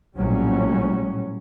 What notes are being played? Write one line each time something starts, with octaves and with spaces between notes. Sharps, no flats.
A#1 A2 F#3 G3 C#4